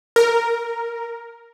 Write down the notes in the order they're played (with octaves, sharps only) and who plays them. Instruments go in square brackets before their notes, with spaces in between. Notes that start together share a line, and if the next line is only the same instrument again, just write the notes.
[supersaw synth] A#4